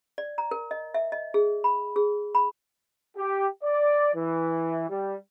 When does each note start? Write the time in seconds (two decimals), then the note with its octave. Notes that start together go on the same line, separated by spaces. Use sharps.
0.18 D5
0.38 A#5
0.51 A#4
0.71 D#5
0.94 E5
1.12 D#5
1.34 G#4
1.64 B5
1.96 G#4
2.35 B5
3.17 G4
3.63 D5
4.15 E3
4.89 G3